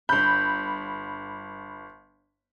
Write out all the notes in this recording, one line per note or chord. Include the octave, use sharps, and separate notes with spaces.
G1 B5 G6